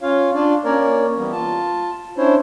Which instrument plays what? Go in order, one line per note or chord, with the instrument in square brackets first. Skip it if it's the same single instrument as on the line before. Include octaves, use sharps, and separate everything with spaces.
[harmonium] C#4 F4 C#5 F5
D4 F4 D5
A#3 C#4 A#4 C#5 D5
E3 G3 A#3 B3
F4 A5
C#4 D4 E4 C5 C#5